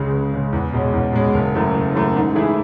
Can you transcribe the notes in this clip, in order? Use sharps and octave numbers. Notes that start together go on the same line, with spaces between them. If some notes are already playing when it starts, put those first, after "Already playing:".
Already playing: C#2 C#3 G#3
C#2
C#3 G#3
E2
B2 G#3 C#4
E2
B2 G#3 C#4
F#1
F#2 E3 A3
F#1
F#2 E3 A3
G#2
E3 A3 E4 G#4